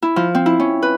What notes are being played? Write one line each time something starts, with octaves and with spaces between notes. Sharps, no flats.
E4
F3
C4
E4
C#4
B4